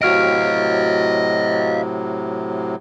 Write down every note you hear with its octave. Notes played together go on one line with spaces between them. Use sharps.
A2 C3 F#3 F#4 D#5 F5 F6 D7